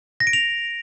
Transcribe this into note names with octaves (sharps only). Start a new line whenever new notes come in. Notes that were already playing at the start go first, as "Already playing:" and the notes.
A#6
D7
F7